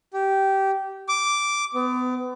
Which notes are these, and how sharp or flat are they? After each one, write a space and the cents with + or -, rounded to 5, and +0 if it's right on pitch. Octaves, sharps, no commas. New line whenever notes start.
G4 -15
D6 -5
B3 +35